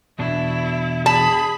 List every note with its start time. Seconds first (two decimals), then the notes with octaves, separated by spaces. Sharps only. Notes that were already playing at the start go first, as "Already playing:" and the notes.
0.19 E2 B2 D4 E4
1.06 G#4 A5 B5